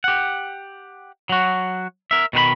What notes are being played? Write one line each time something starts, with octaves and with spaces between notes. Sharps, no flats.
G4 F#5
F#3 F#4
A#4 E5
B2 D#3 B4 B5